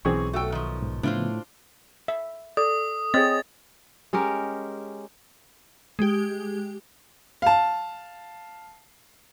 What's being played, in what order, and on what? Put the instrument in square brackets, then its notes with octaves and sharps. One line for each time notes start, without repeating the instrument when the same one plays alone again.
[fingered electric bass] B1 [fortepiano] E3 C4 G#4 [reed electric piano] C#6
[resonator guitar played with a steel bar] A3 G5 [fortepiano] F#4 E6
[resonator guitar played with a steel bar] D#3 F3
[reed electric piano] G#2
[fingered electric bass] A2 [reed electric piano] C#3 F3 B3 [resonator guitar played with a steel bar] D4 F4 C5 [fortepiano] E4
[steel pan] E5
[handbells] A4 [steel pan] D5 [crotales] D#6
[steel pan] C4 [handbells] G#4 C#5 D#5 [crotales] A6
[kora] G#3 C#4 G4 A#4
[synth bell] G#3 G4
[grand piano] F5 A5